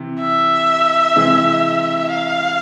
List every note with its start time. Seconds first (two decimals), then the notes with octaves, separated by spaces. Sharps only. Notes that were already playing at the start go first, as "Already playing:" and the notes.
Already playing: C3 E3
0.20 E5
1.16 C3 E3 G#3
2.11 F5